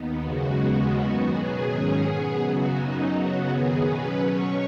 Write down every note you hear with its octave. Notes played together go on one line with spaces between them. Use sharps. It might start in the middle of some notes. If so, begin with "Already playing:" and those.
Already playing: D#2 D#3 B3
F#2 C#3 G#3 F#4
D#2 C#3 G#3 B3 F#4
F#2 D#3 B3 F#4
B2 F#3 B3 G#4
G#2 D#3 F#3 C#4
B2 B3
F#2 C#3 F#3 B3 F#4
F#2 F#3 C#4 D#4
C#3 F#3 B3 F#4
F#2 D#3 B3 G#4
B2 F#3 C#4 B4
B2 F#3 C#4 C#5